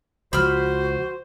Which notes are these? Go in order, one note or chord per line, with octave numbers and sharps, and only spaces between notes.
C#2 F3 F#4 C5 B5 F6